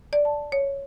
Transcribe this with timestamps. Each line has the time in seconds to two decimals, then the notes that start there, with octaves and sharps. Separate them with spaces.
0.13 D5
0.25 A5
0.52 C#5